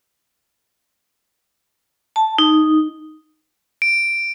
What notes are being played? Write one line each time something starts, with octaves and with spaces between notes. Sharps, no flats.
A5
D#4
D7